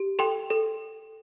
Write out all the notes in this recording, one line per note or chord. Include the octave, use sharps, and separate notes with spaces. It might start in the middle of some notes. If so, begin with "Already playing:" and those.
Already playing: G4
A4 G5 C6
A4